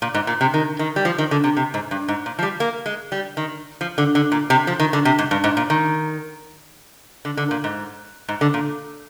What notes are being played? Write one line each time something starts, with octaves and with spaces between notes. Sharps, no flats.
A#2
G#2
A#2
C3
D#3
D#3
G3
F3
D#3
D3
C3
C3
G#2
G2
G#2
A#2
F3
G3
A#3
G#3
G3
D#3
F3
D3
D3
A#2
C3
F3
D#3
D3
C3
G#2
G2
G#2
A#2
D#3
D3
D3
A#2
G#2
G#2
D3
A#2